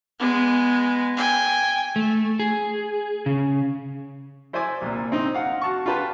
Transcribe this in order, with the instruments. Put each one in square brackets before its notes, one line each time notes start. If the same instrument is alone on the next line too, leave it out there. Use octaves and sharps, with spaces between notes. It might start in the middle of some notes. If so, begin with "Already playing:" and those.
[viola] G#3 B3
G5 G#5
[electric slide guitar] A3
G#4
C#3
[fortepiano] E4 C5 D5 E5 G#5 D6
C2 A#2
C4 D#4
F5 F#5
F#4 A5 C#6
F4 G4 B4 A5